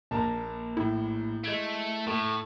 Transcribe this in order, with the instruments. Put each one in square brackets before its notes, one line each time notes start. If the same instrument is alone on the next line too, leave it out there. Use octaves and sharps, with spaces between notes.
[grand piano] A#1 A#5 [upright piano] A#3 A5
[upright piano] A2 [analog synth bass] E4
[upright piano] G#3 G#6 D7 [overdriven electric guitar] A3
[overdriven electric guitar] A2 [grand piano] A3 [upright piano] A4